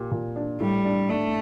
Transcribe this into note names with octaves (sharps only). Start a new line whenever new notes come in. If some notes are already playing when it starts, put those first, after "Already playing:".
Already playing: A#2 G4
A#2
D4
A2 G3
D4
A3 D4